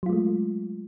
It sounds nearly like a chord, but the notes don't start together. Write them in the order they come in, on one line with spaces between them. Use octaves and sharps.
F#3 F4 G#3 A3